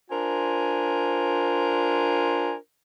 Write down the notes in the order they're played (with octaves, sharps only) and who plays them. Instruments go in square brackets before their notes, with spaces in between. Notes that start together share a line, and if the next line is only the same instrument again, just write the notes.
[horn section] D4 F4 A#4 C5 G#5